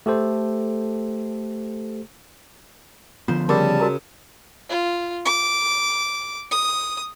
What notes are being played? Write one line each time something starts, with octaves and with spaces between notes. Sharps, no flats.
A3 G4 A4 C5
D3 F3 B3 F4 C5
C#3 G3 A#4 A5 B5 D6
F#4 A#4 A#5
F4
D6
D#6